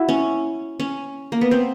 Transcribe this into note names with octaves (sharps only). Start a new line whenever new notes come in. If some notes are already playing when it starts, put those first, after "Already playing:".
Already playing: E4 F#4
C#4
C#4
A#3
B3
C4